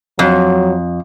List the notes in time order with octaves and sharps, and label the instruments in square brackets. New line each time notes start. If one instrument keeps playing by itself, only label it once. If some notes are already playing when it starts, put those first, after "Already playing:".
[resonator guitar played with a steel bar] F2 [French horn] F#3